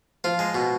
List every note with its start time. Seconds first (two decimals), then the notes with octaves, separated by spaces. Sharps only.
0.24 F3 F4
0.39 G#3
0.54 B2